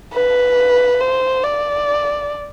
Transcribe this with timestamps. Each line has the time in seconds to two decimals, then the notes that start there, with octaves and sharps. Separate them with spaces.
0.13 B4
1.00 C5
1.43 D5